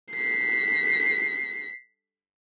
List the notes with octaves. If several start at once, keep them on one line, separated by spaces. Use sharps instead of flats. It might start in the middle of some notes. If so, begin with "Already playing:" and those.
B6 C7